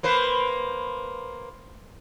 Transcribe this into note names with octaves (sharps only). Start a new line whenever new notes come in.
A#3 B4 C5